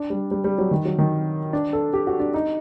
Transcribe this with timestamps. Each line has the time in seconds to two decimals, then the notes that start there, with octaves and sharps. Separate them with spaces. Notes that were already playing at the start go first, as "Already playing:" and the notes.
Already playing: D4
0.10 G3
0.31 G3
0.44 G3
0.58 F#3
0.71 D#3
0.85 F#3
0.99 D#3
1.53 D4
1.73 A4
1.94 G4
2.07 F#4
2.20 D4
2.34 D#4